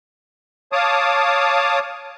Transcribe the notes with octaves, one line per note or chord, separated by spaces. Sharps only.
C#5 F5 A5 D6 D#6